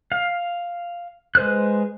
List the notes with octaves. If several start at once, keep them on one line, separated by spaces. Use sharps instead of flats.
F5
G#3 B4 C5 F6 F#6